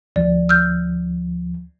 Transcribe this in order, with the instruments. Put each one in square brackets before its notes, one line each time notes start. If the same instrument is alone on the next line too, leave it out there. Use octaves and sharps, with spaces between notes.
[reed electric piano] D2 F3 [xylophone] D5
[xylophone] E6 F6 G6